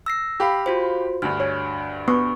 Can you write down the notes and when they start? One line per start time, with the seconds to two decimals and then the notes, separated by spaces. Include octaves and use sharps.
0.06 E6 A#6 C7
0.40 G4 F5 B5
0.66 F4 F#4 C5
1.22 D2 G2 F6
1.40 C#5
2.08 B3 C#6